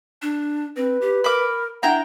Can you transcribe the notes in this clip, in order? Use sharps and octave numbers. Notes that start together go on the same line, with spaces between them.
D4
C4 B4
G4
A#4 B5 D6
D4 E4 F#5 G5 A#5